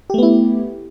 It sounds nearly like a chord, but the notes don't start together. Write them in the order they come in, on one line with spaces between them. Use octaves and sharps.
G4 A3 B3 E4